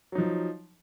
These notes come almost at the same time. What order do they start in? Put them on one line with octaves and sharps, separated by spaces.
F#3 D#4 F3